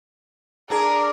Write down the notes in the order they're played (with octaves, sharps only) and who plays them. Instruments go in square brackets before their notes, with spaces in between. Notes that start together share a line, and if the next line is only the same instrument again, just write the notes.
[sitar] D4 G#4 [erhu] A#4